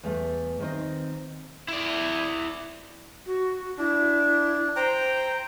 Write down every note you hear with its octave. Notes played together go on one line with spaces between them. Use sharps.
E2 A3
D#3 C4 C5 D#5
E4 D5
F#4
D4 E4
C5 G5 A#5